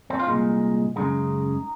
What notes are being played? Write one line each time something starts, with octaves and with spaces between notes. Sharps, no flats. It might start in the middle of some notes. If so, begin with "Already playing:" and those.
C4
F4
C2 A#2 G#3 D#4
F#2 C#3 G#3 D#4